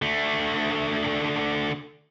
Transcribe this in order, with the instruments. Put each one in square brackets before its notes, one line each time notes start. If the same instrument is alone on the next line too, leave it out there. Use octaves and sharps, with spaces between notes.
[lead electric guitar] D3 A3